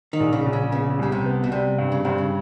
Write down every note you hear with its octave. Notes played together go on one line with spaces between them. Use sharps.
D#3
A#1
C#3
A#1
C#3
C#3 B3
C2 C#3
C3
B3
B2
C3 G3
G2
C#3
G2 C3
C#3